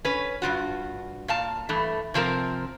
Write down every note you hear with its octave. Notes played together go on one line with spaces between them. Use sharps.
C#4 B4
G2 F3 F4 F#4
A#2 F5 A5
G2 E3 A3
C3 F3 C4 A#4